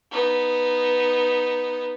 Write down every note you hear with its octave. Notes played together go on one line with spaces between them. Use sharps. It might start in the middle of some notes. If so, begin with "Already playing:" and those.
B3 D#4